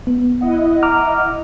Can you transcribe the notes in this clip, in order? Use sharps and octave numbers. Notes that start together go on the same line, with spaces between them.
B3
E4 D#5 F#5
A#5 D6 F6